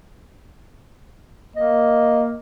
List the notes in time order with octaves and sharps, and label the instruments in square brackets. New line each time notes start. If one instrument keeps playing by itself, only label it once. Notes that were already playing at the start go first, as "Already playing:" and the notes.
[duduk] A#3 [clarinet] D#5